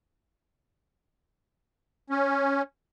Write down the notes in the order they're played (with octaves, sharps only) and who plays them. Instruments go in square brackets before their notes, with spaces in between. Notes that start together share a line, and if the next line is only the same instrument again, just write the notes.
[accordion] C#4